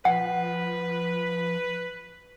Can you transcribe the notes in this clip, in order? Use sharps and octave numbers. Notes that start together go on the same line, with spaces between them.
F3 B4 F#5